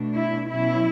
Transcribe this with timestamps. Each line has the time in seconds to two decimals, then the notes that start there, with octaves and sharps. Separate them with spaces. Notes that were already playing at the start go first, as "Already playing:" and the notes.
Already playing: B2 A3 D4
0.18 E4
0.49 B2 F#3 C#4 E4